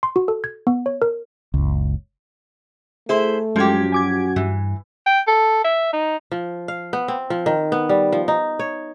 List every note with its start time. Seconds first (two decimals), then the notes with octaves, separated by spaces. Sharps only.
0.03 C6
0.16 F#4
0.28 A4
0.44 G#6
0.67 B3
0.86 C#5
1.02 A#4
1.54 F#1 C#2
3.09 A3 E4 G#4 C5
3.56 F#2 F3 G#3 G4 G#6
3.92 F#4 G#5 D6 G#6
4.36 G2 E3
5.06 G5
5.27 A4
5.64 E5
5.93 D#4
6.32 F3
6.68 F5
6.93 B3
7.08 C4
7.30 F3
7.46 D#3
7.72 B3
7.89 G3
8.12 F3
8.28 D#4
8.59 C#5